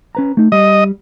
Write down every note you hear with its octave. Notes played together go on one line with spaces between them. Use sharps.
C#4 B4 A#5
A3 D#4
G3 D#5